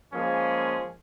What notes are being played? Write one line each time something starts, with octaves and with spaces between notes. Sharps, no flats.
F3 G#3 A#3 C#4 G#4